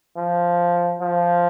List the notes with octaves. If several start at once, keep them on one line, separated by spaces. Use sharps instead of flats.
F3
F3